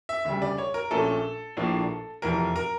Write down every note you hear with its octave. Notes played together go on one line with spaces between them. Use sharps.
E5
D2 C#3 G3 E5
D5
C#5
A#4
A#1 A#2 A3 C#4 A4
A#1 A2 F3 A#3 D4
F1 F2 E3 A#4
A#4